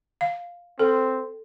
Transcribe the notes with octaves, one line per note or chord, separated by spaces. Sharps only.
F5
C4 A4